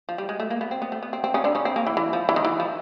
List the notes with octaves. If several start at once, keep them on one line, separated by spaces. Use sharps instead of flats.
F3
G3
G#3
A3
A#3
B3
C4
B3
A3
B3
C4
C4
C#3 C#4
D3 D4
C#3 C#4
C4
A#3
E3
E3
F3
E3
D#3
E3
F3